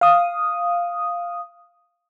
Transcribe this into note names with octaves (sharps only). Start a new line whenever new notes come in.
F5 D#6